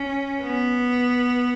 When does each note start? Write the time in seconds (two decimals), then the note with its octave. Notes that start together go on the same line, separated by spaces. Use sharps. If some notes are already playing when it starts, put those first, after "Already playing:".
Already playing: C#4
0.43 B3